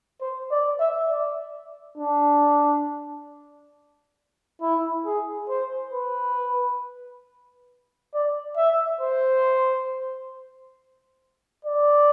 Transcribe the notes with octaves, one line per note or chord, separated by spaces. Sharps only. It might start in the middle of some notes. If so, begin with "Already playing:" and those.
C5
D5
E5
D5
D4
E4
G#4
C5
B4
D5
E5
C5
D5